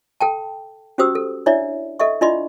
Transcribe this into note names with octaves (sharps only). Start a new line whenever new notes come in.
A4 G5 A5
C#4 F#4 G4 C5 D#6 E6
A4
D4 E4 C#5 D5 E5
A4 D#5 E5 C#6
D4 E4 F4 D5 D#5 C6